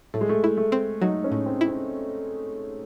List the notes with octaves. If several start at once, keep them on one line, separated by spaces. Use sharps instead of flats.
A2 A3
G#3
A3
E4
A3
C4
F#3 D#4
C#4
A2
C4
E4
C4